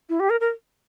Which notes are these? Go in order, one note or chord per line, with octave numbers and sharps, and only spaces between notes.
E4
G4
A#4
A#4